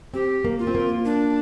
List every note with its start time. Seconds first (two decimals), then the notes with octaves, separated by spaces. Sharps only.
0.14 C4 G4
0.45 A#3
0.59 F4
0.67 C4
0.75 A#3
1.05 D4